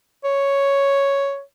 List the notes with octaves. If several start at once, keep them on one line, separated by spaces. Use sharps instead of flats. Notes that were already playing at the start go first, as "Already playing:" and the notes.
C#5